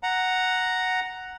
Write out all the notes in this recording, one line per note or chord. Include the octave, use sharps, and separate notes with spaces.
F#5 A#5